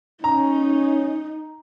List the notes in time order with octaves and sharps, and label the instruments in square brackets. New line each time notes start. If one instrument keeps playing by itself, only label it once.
[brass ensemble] C#4 [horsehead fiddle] D#4 [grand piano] A#5